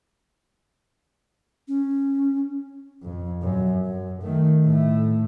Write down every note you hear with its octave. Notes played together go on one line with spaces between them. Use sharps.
C#4
F2
F#2
F#2
D#3 A3
A2 A3